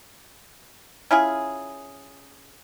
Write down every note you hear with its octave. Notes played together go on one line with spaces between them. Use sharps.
C#4 E4 F4 G#4